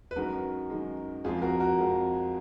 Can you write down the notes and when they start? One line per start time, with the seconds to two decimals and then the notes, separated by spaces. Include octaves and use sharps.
0.11 B4
0.16 F#2 D#3 G#3 F#4 A#4
0.70 F#2 D#3 G#3
1.24 F2 F3 G#3 F4 G#4
1.42 F#4 A#4
1.60 F#4 A#4
1.79 F2 F3 G#3